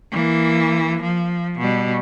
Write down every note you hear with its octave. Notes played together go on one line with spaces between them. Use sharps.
E3 A#3
F3
B2 G3